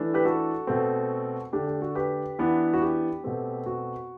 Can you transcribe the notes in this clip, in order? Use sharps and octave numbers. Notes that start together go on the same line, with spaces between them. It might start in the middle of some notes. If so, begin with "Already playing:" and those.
Already playing: E3 A3 D4
G4 B4
F#4 A4
B2 A3 C4
D3 A3 D4 G4
G4
F#4 A4
G4 B4
E3 B3 D4
F#4
G4
B2 A3 C4
F#4